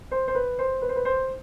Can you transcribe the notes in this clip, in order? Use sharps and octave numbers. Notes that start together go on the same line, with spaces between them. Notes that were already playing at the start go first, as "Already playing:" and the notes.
C5
C5
B4
C5
B4
C5
B4
C5